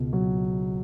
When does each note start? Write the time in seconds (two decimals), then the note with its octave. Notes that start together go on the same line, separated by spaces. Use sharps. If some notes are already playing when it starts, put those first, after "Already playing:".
Already playing: C#2 B2
0.13 F#3